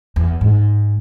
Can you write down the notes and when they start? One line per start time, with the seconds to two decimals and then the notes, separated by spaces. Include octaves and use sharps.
0.16 E2
0.41 G#2